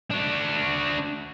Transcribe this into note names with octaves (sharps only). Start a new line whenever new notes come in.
D4 F#4